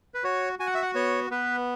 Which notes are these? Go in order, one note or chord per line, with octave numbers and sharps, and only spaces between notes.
B4
F#4 C#5
F#4 G#5
F#5
E5
F#5
B3 C#5
B3 B4